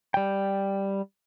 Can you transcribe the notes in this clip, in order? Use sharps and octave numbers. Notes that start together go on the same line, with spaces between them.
G3 G5